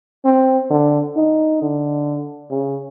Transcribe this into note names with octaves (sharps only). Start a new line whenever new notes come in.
C4
D3
D#4
D3
C#3